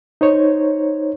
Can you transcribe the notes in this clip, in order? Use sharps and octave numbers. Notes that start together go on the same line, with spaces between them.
D#4 C5 C#5